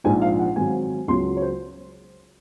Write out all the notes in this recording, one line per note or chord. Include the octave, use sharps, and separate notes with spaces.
A#1 G#2 F3 G#5
F5
F#5
G#2 D#3 F#3 C4 G#5
C#2 C#3 F#3 C6
C#5
C5